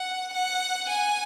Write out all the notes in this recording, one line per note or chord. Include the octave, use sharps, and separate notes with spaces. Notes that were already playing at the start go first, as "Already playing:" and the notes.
Already playing: F#5
F#5
G#5